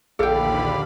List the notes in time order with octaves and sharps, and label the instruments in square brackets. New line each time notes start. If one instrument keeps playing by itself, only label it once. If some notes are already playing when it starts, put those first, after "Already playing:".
[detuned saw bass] A#1 [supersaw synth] D#2 D3 B5 [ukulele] A4 G5 [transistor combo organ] D5 F5